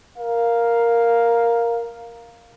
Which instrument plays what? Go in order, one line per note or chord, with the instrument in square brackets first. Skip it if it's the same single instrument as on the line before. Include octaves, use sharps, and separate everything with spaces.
[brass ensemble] A#4 F5